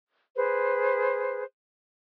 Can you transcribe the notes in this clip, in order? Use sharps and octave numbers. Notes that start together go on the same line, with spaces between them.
G#4 B4 C5